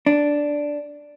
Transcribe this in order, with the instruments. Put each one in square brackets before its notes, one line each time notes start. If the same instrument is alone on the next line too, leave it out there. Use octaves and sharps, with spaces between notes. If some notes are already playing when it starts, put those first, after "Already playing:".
[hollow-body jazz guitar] D4